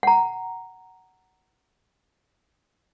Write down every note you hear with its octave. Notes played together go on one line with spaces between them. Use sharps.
F#5 A#5